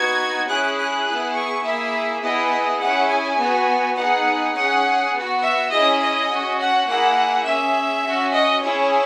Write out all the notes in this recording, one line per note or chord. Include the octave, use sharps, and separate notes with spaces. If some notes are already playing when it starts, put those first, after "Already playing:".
Already playing: B3 D#4 F#4 G#6
C#4 E4 G#4 F#6
F#6
B3 E4 G#4
C#6
A#3 E4 G#4 E5
B3 E4 G#4 D#5
C#4 E4 G#4 F#5
G#5
B3 F#4
B3 D#4 G#4 F#5
C#4 G#4 F#5
B3 F#4
E5
C#4 E4 G#4 D#5
D#5
C#4 F#4
F#5
A#3 E4 G#4 F#5
C#4 G#4 E5
C#4 F#4
D#5
C#4 E4 G#4 C#5